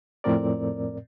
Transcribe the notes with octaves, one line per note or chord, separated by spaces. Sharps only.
F2 A2 C4 A#4 D5